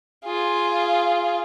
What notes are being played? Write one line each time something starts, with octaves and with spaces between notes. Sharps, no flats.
F4 G#4